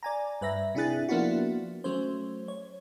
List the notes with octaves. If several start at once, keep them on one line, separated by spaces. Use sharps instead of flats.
D5 G#5 A#5
G2 B4 E5 A#6
C3 D4 E4 G#4 F#6 A6
F3 A#3 B3 D4 E4 F#4
F#3 A3 C#4 C5
C#5